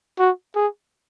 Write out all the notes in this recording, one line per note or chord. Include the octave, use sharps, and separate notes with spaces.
F#4
G#4